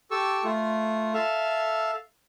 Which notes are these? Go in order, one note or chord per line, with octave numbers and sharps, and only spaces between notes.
G4 A4 C#6 E6
A3 F4
A4 E5 F5